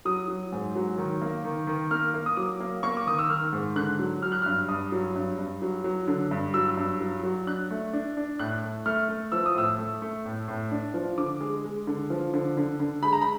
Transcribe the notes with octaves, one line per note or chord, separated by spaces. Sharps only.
F#3 D#6
F#3
G#2
F#3
D#3
A#3
D#3
D#3
A#3 F6
A#3
D#6
F#3 D6
A#3
A#3 C#6
D6
D#3 D#6
E6
D#3 F6
G#2
D3 F#6
F#3
F#3 F6
F#6
G2 F6
G2 D#6
F#3
G2
G2
F#3
F#3
D3
G2
F#3 E6
G2
F#3
F#3
D4 F#6
A3
D4
D4
A2 F#6
A3
A3 F6
A3
F3 E6
D#6
A2 E6
A3
A3
A2
A2
D4
F3
D3 D6
G#3
G#3
D3
F3
D3
D3
D3
G#3 B5
A#5
B5